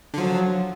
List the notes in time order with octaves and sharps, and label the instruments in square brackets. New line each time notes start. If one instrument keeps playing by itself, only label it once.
[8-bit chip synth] D3
[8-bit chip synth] F3 [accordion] F#3